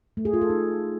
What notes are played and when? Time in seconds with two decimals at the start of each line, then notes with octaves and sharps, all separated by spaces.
0.17 A3
0.25 G#4
0.33 F4
0.41 A4
0.50 D#4